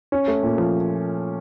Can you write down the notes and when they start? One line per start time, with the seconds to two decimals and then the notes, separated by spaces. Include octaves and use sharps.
0.12 C#4
0.28 A3
0.43 A#2
0.58 F3